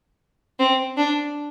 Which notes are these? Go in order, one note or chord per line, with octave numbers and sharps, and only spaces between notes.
C4
D4